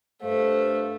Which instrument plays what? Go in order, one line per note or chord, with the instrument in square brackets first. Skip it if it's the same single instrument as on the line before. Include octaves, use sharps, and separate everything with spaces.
[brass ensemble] G2 C5 F5 [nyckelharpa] A3